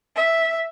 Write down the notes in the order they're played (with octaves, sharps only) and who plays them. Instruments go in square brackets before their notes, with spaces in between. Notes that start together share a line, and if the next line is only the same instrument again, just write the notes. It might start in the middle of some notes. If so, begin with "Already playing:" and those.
[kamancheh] E5